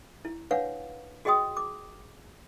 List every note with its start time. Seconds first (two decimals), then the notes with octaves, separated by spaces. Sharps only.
0.25 E4
0.51 D4 B4 C#5 F5 F#5
1.25 F#4 G#4 D#5 G5 C6 D#6
1.57 D6